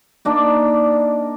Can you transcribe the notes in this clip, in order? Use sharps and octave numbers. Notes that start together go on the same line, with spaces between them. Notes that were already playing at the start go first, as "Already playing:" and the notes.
A#3 D4 D#4